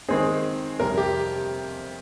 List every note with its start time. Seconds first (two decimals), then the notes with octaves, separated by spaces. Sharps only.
0.08 D#3 G#3 C4 D#4 G#4 C5
0.79 F2 C3 G3 A#4
0.97 G4